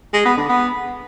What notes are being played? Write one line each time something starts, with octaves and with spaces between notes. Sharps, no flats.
G#3
B3
D3
B3